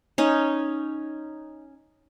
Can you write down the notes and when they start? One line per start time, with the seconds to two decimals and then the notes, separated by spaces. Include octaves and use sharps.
0.18 C#4 D#4